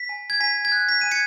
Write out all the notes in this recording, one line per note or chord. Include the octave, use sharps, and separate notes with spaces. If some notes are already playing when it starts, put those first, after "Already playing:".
Already playing: B6
G#5
G#6
G#5 B6
G#6
F#6
B6
G#5 D#7
G#6 C#7